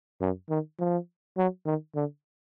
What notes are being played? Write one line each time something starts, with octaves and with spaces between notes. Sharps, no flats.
F#2
D#3
F3
F#3
D#3
D3